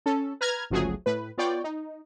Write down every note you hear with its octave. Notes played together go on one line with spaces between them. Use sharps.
C#4 A4
B4 A#5 F6 G#6
G1 C#2 F3 F#3 A3 G#4
A2 B4
B3 F4 C#5 D5 G5
D#4